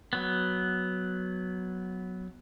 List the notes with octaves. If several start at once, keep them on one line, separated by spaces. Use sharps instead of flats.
F#3 B3